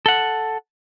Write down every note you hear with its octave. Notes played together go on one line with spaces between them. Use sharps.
A4 F#5